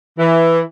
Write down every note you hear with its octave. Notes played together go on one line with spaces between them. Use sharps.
E3